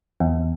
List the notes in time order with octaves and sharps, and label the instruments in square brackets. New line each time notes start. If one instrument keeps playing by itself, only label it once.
[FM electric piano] E2